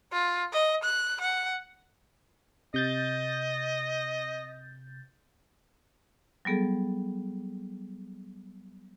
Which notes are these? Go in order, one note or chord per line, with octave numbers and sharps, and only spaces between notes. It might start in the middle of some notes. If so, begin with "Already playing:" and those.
F4
D#5
F#6
F#5
C3 D#5 G6 A6
F#3 G3 B3 G#4 A4